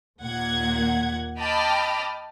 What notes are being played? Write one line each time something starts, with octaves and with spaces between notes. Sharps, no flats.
D#2 A#2 F#5 G#6
D#5 G5 A5 B5 D6 F6